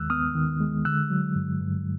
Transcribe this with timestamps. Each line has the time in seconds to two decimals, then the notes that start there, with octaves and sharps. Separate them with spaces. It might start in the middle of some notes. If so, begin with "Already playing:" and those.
Already playing: D#2 D#3 G#3 E6 F#6
0.10 B3 D#6 F6
0.35 D#3
0.60 G#3
0.85 D3 E6 F#6
1.10 F#3
1.35 G2
1.61 G2